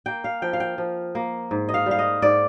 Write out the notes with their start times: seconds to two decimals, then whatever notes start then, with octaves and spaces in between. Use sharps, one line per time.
0.06 A#3 G5
0.24 F5
0.42 F3 G5
0.53 F5
0.60 G5
0.78 F3
1.15 A#3
1.51 G#2
1.69 D#5
1.74 F5
1.86 G3 F5
1.99 D#5
2.22 G#2 D5